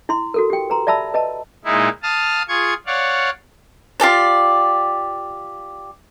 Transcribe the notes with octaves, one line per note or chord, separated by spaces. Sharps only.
E4 C6
F#4 A4 A#4
G4 G5
B4 A#5 C6
D5 E5 A5 B5 E6
B4 D#5 A5
A#2 G#3 D#4 E4
F5 A5 D#6 F6
F4 G#4 C#6 G#6
C#5 D5 F5 F#5
F4 G4 A4 D5